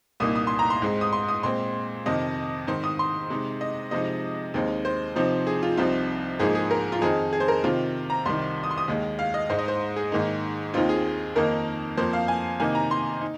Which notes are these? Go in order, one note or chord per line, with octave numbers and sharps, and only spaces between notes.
C2 A#2 A#3 D#4 D#6
D#6
C6
A#5
C6
G#2 G#3 C4
D#6
C6
D#6
A#2 G#3 C4 C6
F2 C3 D#3 D#5
G#2 D#3 C4 D#4 C5
D#6
C6
C3 G#3 D#4
D#5
C3 F3 G#3 D#4 D#5
D#2 D#3 G#3 C4 D#4
C5
C3 F3 C4 D#4
G#4
F4
C2 C3 F3 C4 D#4 F4
G#2 F3 A#3 D#4 G#4
G#4
A#4
F4
F2 D#3 C4 D#4 G#4
G#4
C5
A#4
C3 D#3 C4 F4
A#5
C2 C3 D#3 C6
D#6
C6
D#6
D#2 D#3 G#3
F5
D#5
G#2 G#3 D#4 C5
D#5
C5
G#4
G#2 D#3 A#3 D#4
D#2 D#3 C4 D#4 F4
G#4
F2 D#3 A#3 D#4 A#4
F2 F3 A#3 C5
F5
G#5
C3 D#3 A#3 D#4 G#5
A#5
C6
D#4